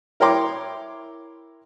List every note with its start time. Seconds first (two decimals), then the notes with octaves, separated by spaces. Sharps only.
0.20 E4 A#4 C#5 G5 C6 D6